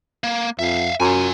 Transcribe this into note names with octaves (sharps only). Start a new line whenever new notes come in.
A#3
F2 E5 F5
F#2 F4 G#5